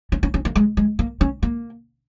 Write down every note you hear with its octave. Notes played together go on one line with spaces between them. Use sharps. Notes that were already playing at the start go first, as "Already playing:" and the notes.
C#4
C#4
C#4
A#3
G#3
G#3
A#3
C#4
A#3